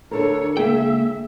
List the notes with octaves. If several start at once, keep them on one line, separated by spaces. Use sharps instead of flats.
D2 D4 A4 A#4 C#5
C#2 A#3 G#4 E5 G5